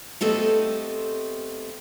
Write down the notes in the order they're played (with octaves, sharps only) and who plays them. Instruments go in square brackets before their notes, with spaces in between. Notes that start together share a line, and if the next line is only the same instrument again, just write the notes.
[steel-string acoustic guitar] A3 B3 C4 G4 A4 D#5